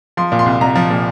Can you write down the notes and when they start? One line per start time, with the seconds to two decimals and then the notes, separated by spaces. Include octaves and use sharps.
0.17 F3 C6
0.32 A#2
0.39 C6
0.46 C2
0.61 C2 A#5
0.76 F3
0.90 A#2